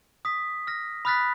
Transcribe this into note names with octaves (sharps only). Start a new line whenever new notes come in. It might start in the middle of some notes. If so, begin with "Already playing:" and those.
D#6 B6
F6 A#6
B5 D#6 F6 F#6 A6 B6